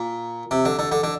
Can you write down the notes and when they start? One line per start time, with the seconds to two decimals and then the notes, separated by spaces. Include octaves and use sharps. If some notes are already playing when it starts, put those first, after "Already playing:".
Already playing: A#2
0.51 C3
0.65 D3
0.79 D3
0.92 D3
1.03 D3